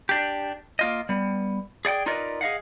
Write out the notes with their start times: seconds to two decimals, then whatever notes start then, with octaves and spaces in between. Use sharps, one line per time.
0.09 D4 G4
0.79 A#3 F4 D#5
1.09 G3 B3
1.85 G#4 D5 F#5 G5
2.06 D#4 F4 A#4 B4 D5 D#5
2.41 G#4 D#5 F5 F#5